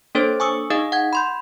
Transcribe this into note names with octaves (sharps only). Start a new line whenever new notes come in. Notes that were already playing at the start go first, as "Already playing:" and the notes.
A#3 D4 A4 C5 C#5 A6
G#5 C#6 D#6 E6
D#4 G#4 D#5 F5 D#6
F#5 G#6
B5 C6 G6